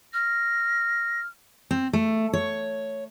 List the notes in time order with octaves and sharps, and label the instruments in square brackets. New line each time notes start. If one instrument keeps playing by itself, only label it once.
[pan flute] F6 [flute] A#6
[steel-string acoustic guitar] C4
A3
C#5